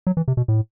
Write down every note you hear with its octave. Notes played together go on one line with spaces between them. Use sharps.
F#3
E3
C3
B2
A2